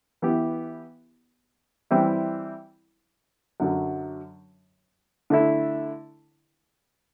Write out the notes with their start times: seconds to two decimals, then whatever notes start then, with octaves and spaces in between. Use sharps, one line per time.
0.22 E3 B3 E4 G4
1.91 E3 G3 C4 E4
3.60 F#2 D3 F#3
5.30 D3 A3 E4